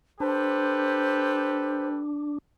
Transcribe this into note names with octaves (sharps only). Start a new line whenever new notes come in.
D4 G4 A4 B4 C5